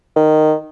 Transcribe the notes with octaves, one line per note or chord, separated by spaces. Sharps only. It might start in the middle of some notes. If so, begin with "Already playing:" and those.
D#3